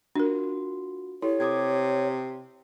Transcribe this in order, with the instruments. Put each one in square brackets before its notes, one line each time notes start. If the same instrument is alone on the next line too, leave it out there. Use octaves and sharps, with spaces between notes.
[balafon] D4 A#4 [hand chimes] F4 F#4
[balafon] E4 [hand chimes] G4 A4 [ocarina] C#5
[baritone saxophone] C3 [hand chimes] D6 D#6 G#6